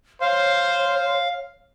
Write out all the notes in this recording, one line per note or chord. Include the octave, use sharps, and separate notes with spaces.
C5 C#5 F5